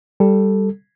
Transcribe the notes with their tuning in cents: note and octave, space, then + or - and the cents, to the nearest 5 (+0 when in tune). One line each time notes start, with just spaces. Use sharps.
G3 +0 A4 +0